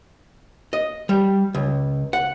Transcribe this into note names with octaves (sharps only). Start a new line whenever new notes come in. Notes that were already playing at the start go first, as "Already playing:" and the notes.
D#5
G3
C#2
F#5